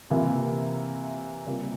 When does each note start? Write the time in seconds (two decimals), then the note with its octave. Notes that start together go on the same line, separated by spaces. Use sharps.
0.10 C3 E3 A#3 F4
1.46 C3 G3 A#3 F4